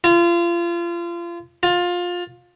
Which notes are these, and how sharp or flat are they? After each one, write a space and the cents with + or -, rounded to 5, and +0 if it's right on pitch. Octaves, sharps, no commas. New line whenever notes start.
F4 -30
F4 +20